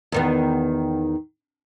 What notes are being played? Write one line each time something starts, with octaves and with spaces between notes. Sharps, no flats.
E2 D#3 B3